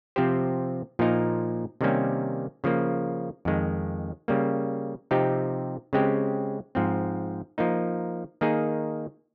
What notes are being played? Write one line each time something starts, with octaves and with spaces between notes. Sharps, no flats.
C3 F3 C4 G4 C5
A#2 F3 A#3 D#4 A#4
C3 D#3 G3 A#3 C#4
C#3 F3 A#3
F2 D#3 G#3
C#3 G3 A#3
C3 F3 C4 D#4 G4
C#3 G#3 C4 G4
G#2 F3 C4
F3 A#3 D#4
D#3 A#3 D#4 G#4